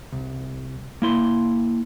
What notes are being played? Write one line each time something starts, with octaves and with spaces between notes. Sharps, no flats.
C2
A#3 E4 C6